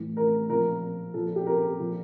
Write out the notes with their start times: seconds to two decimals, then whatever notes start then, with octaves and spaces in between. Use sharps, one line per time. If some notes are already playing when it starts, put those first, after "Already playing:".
Already playing: A2 E3
0.17 A#4
0.49 A#2 F3 A#4
1.14 A#2 F3 A4
1.36 G4
1.47 A#4
1.80 A#2 F3